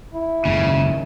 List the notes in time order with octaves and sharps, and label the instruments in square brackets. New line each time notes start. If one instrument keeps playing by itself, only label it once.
[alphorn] E4
[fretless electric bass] F#1 [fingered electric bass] D#2 G#2 [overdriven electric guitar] C#3